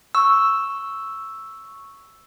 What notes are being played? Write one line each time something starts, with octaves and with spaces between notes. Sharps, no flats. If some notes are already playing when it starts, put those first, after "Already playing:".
C#6 E6